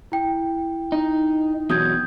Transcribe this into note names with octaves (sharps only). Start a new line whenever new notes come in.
E4 G5
D#4
E2 B2 F#3 D#6 G6 G#6